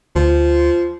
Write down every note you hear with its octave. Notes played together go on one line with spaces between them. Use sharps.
D2 F3